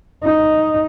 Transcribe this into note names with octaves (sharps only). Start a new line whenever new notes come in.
D#4